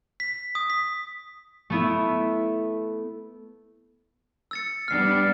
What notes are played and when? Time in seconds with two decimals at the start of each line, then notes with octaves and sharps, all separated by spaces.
0.20 B6
0.55 D#6
0.70 B6
1.70 A3 B3 E4
4.51 E6 A6 C#7
4.88 G3 B3 D4 F6 C7